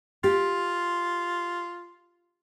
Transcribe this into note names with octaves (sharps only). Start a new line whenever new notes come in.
F4 G4